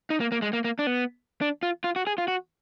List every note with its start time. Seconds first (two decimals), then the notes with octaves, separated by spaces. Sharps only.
0.10 D#4
0.20 A#3
0.32 A#3
0.42 G#3
0.53 A#3
0.64 A#3
0.79 D4
0.87 B3
1.41 D4
1.63 F4
1.84 F4
1.96 F#4
2.07 G#4
2.18 F4
2.28 F#4